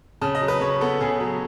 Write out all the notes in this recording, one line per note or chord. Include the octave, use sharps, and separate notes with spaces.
C#3 A5
D#5
F#3
B4
C#3 C#5
B3 A4
C#3 G#4
F#3